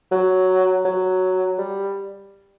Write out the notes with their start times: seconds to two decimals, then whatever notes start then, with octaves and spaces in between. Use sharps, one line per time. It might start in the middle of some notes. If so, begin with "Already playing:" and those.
0.12 F#3
0.85 F#3
1.58 G3